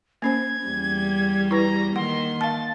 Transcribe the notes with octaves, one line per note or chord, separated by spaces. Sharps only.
A#3 C#4 C5 G#6
E2 G3
E4 B4 A#5
D#3 A#3 F#5 C6
F5 A5 A6